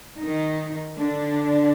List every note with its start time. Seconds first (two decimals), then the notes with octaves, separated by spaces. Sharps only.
0.23 D#3 D#4
0.97 D3 D4